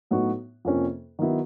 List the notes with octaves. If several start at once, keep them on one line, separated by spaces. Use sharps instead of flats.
A2 F#3 B3 D#4 F#4
F2 C3 F3 A#3 C#4
D#3 F#3 B3 E4